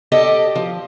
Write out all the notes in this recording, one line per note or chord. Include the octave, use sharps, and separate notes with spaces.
G4 A4 D5 D#5
F3